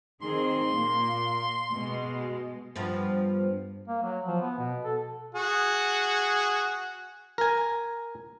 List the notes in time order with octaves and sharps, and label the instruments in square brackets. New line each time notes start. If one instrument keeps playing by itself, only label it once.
[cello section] D#3 C4 G#4 [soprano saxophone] C6
[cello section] A#2 A#3
B2 G#3
[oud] G2 F3 B3
[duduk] A#3
F#3
F3
B3
B2
A4
[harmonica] F#4 G#4
[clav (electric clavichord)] A#4 G#5